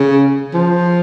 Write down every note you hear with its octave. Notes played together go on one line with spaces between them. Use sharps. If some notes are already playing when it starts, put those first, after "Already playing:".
Already playing: C#3
F3